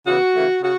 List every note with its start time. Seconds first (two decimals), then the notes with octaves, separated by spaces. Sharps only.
0.06 C#3 E3 B3 F#4
0.34 C#3 E3 A3
0.63 C#3 F#4